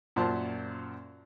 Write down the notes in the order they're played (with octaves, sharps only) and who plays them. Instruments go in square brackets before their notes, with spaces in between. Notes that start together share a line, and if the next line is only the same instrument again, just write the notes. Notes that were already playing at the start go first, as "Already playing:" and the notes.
[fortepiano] F#2 A#2 F4 C5 A5 C6